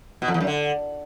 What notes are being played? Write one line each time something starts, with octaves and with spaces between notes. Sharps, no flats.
B2
F2
E2
F#2
D3